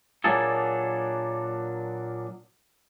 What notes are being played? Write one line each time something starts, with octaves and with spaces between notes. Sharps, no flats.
A#2 F#3 A#3 D4 G#4 A4